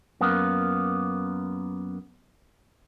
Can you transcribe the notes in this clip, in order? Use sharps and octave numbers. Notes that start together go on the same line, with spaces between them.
F#2 A#3 B3